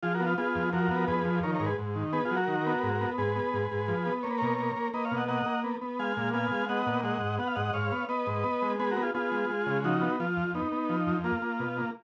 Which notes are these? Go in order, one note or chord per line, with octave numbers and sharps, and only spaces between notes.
F3 F4 G#4
F#4 A#4
B3
F4
B3 F4 G#4
F2
F3 F#4 A#4
B3
F2 G#4 B4
F3
D#3 A#4 C#5
A#4 C#5
G#2
G#4 B4
G#2
D#3
B3 G#4 B4
F4 G#4
F#3
F#4 A#4
D#3
B3
G#2
B3
G#2 G#4 B4
B3
G#2
G#2
F3
B3
A#3 C#5
B4
B2 A#4 C#5
A#3
A#3
A#3 B4 D#5
C#5 F5
B2
D#5 F#5
A#3 D#5 F#5
A#3
B3
B3
G#3 F5 G#5
A#2
B3 F5 G#5
G#3
B3 D#5 F#5
A#2
G#3 D#5 F#5
G#2
B3 F#5
F5
G#2 D#5 F#5
D#5
G#2 C#5 F5
B3
B3 B4 D#5
G#2
B3
G#3
B3 G#4 B4
F#4 A#4
B3
F4 G#4
B3 F4 G#4
G#3
G#3
C#3
F3 D#4 F#4
B3
F3 F4
F2
B3 D#4
B3
F3
F2
A#3 F4
A#3
B2
A#3